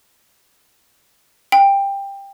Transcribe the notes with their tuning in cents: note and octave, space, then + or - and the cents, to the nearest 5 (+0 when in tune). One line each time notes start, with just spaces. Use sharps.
G5 +15